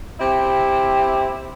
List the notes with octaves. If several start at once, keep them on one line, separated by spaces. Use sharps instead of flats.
C4 E4 G4